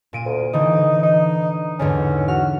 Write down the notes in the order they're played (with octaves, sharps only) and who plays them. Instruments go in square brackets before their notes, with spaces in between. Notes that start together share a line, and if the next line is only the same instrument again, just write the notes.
[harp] A#2 D7 D#7
[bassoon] D2
[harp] D3 E3 [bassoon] D#4
[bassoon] D#4
[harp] E2 G#2 D3 [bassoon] C#4
[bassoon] F#4 [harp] F6